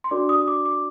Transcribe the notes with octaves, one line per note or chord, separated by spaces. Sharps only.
C6
D4 F#4 A#4 D5 D6
D#6
D6
D6